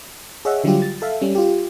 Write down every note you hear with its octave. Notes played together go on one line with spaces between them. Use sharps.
G#4 C#5 D#5 E5 F#5
D3 F#3 G3 D4 F4 G4
A6
A4 E5 F5
G3 C#4
F4 G4